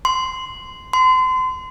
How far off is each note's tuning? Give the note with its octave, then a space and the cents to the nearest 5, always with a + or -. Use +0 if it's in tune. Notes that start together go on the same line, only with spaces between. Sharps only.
C6 -15
C6 -35